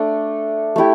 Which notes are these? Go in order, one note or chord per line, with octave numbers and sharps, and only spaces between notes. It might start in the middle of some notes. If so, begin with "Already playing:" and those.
Already playing: A3 D4 A4
A3 E4 G4